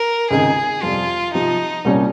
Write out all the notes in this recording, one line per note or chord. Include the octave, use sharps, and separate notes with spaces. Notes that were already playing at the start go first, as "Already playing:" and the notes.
Already playing: A#4
C#2 C3 D#3 G#3 D#4 G#4
F2 C3 G3 F4
C3 F3 C4 D#4 G4
C2 A#2 G3 C#4